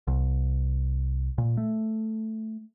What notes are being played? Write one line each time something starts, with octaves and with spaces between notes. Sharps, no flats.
C2
A#2
A3